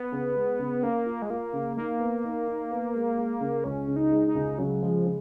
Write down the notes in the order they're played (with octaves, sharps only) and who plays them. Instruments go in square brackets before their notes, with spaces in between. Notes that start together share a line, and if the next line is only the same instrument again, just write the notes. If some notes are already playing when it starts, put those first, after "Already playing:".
Already playing: [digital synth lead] B3
[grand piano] C#3
G#3
C#3
[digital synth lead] A#3 [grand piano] C#4
[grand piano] F4
[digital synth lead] G#3
[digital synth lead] A#3 [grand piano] F4
[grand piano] C#3
[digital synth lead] A#3 [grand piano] D#4
[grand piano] B3
D#4
D#4
B3
G#3
G#3
C#3
[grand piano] C#2 [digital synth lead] C#4
[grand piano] C#3
[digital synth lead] D#4
[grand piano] G#3
[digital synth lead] D#4
[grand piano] C#2
[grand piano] C#3 [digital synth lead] F#3
[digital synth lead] F3 [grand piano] G#3
[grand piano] C#3